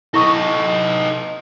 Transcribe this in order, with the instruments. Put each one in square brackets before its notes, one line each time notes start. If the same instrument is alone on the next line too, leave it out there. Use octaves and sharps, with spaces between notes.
[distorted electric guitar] D#4 A4 [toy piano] E4 C#6 D#6